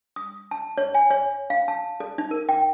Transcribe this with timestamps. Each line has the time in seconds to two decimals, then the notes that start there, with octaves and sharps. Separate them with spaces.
0.16 D#6
0.51 A5
0.78 C#5
0.94 G#5
1.11 C#5
1.50 F5
1.68 A5
2.00 A4
2.18 D#4
2.31 A#4
2.49 G5